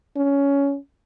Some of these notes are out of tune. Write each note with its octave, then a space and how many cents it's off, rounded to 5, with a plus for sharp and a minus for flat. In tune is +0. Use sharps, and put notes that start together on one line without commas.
C#4 +15